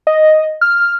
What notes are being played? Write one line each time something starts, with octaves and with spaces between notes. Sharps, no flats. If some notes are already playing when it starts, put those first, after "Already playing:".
D#5
F6